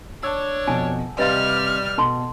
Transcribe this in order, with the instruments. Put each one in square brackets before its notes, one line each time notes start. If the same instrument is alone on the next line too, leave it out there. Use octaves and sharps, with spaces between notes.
[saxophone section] D4 C#5 [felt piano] A5 E6
[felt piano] F2 B2 [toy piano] G#5 A5
[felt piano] C3 C6 [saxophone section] G3 [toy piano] B4 D#5 F5 [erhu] F6
[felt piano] B2 [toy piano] A4 A5 C6